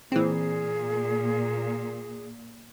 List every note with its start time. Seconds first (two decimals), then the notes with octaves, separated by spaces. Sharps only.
0.12 A#2 E3 C4 G#4